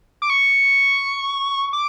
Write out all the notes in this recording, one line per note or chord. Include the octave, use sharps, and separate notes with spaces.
D6
C#6
D6